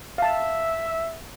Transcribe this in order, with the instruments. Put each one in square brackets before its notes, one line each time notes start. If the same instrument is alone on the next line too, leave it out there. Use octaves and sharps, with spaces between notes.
[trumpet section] E5 [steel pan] F5 A5